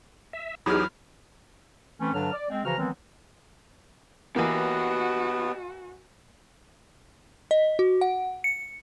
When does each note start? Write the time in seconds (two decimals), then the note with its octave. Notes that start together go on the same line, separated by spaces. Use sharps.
0.33 E5
0.66 E2 E3 F#3 D#4 G4 G#4 B5 F6
2.00 E3 A3 C4 C#4
2.14 G2 D3 F#3 D4 A5 F6
2.33 D5
2.50 G#3 C4
2.65 C#3 E3 F3 F#4 A#5 F6
2.78 D#3 E3 F#3 G#3 B3 C4
4.36 E3 A#3 B3 F#4 G4 D#5
7.51 D#5
7.79 F#4
8.01 F#5
8.44 C#7